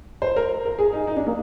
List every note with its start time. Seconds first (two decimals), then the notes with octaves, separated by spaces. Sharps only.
0.22 C5
0.36 A#4
0.65 A#4
0.79 G#4
0.93 D#4
1.07 D#4
1.17 D4
1.26 A#3